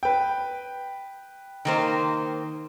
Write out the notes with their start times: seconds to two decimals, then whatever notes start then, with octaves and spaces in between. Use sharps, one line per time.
0.03 B4 G5
1.65 D#3 A#3 C5